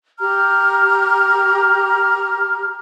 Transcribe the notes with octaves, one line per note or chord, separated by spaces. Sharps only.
G4 A#5 F6